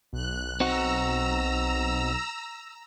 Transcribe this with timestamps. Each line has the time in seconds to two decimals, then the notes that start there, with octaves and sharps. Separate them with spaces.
0.13 B1 F#6
0.60 C4 D#4 F#4 A#5 E6